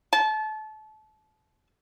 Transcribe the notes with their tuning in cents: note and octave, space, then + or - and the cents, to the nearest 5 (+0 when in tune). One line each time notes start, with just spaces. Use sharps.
A5 -30